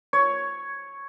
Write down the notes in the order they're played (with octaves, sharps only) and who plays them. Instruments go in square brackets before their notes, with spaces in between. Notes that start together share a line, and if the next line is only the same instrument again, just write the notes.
[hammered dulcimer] C#5